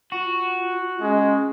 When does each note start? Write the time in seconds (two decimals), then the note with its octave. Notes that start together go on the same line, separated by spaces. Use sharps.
0.12 F4 F#4
1.01 G#3 C#4